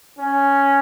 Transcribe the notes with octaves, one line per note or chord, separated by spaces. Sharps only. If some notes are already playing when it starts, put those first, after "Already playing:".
C#4